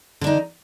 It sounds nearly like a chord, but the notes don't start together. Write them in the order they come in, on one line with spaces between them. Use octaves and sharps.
D3 D4 D#4